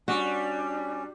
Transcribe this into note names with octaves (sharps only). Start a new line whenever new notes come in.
G3 C#4 D4 F#4